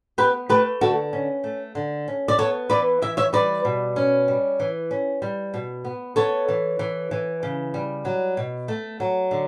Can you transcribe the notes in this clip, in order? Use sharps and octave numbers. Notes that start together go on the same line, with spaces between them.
B3 G4 B4
A3 G4 B4
D3 F#4 A4
C#4
A3
D3
C#4
D5
B3 A4 C#5
E3 B4 D5
E3 E5
C#5 E5
G3 B4 D5
B2
C#4
G3
E3
C#4
G3
B2
B3
B3 A4 C#5
E3
E3
E3
C#3
G3
F#3
B2
A3
F#3
D3